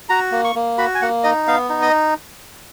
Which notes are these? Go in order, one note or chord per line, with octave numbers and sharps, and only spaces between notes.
F#4 A#5
A#3
C#6
A#3
F#4 B5
G#5
A#3 F#5
D#4 D#5
B3 F5
D#4
D#5